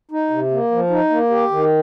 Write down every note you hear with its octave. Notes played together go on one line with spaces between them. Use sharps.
D#4
C3
A#3
F3
D#4
A#3
G4
D#3